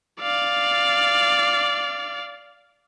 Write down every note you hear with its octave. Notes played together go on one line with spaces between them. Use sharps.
D5 F5